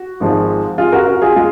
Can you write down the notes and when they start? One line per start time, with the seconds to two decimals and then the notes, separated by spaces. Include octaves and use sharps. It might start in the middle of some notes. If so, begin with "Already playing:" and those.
Already playing: F#4
0.20 G#1 G#2 F3 G#3
0.78 F4 G#4
0.92 F#4 A#4
1.07 F#4 A#4
1.22 F4 G#4
1.36 G#3 F4